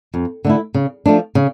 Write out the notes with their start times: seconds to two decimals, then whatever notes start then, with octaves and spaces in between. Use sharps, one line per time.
0.14 F2
0.45 D3 A3 E4
0.74 C#3
1.06 F3 A3 D4
1.35 C#3